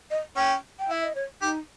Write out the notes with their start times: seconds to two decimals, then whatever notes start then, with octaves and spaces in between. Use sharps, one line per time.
0.11 D#5
0.36 C#4 G5
0.79 G5
0.89 E4 E5
1.03 D#5
1.15 C#5
1.42 D#4 G4